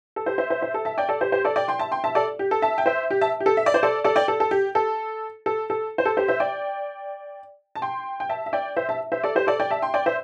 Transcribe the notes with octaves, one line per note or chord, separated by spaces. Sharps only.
A4
G4 C5
C5 E5
C5 E5
C5 E5
A4
E5 A5
D5 G5
A4 D5
G4 C5
G4 C5
A4 D5
D5 G5
G5 C6
E5 A5
G5 C6
E5 A5
A4 D5
G4
A4
E5 A5
G5
C5 E5
G4
E5 A5
G4
A4
E5
D5
C5
A4 D5
A4 D5
D5 G5
A4
A4
G4
A4
A4
A4
C5
A4
G4 C5
C5 E5
D5 G5
A5
G5 C6
G5
E5 A5
E5
D5 G5
C5 E5
E5 A5
C5 E5
A4 D5
G4 C5
A4 D5
D5 G5
E5 A5
G5 C6
D5 G5
C5 E5